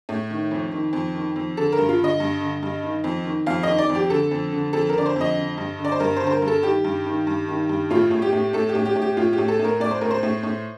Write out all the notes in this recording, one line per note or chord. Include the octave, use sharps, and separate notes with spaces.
A2
D#3
F2
D#3
F2
D#3
F2
D3 A4
A#4
G2
F4
D3
D#5
G2
D3
G2
D#3
F2
D#3
F2 F5
D#3 D#5
D5
F2
G4
D3 A4
F2
D3
F2 A4
A#4
D3 D5
C5
F2 D#5
D3
G2
D3
D5
C5
G2 A#4
C5
D3
C5
A#4
G2
A4
D#3 G4
G2
D#3
G2
D#3
G2
A2 F4
A2
G4
A2
A2 A4
G4
A2
G4
A2
G4
A2 F4
G4
A2
A4
A2
A#4
A2 D5
C5
A2 A#4
C5
A2
A2